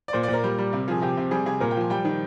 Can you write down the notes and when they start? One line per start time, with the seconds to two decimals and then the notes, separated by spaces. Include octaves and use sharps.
0.08 D5
0.13 A#2 C5
0.23 A#2 D5
0.33 A#4
0.44 G3
0.58 G3
0.73 C3
0.88 F3 G#4
1.02 C3 G4
1.17 C3
1.31 G3 G#4
1.46 C3 G#4
1.60 A#2 A#4
1.71 G5
1.76 F3 G#5
1.90 G3 G5
2.05 D#3